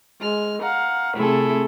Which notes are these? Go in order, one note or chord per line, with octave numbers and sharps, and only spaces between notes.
G#3 F6
F5 F#5 A#5
C3 A3 C4 E4 G#4 A4